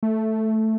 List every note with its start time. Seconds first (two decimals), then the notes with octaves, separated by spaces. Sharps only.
0.03 A3